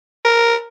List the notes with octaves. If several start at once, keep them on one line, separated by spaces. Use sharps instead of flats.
A#4